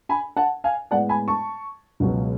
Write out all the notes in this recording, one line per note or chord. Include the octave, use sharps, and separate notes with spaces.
G#5 B5
F#5 A5
F5 G#5
A2 G#3 B3 D5 F#5
G#5 B5
A5 C#6
C#2 B2 F#3